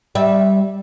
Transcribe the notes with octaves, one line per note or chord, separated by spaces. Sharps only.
G3 E5